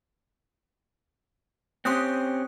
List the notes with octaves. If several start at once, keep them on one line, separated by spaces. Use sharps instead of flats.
C4 C#4 G4 C6 D#6 F#6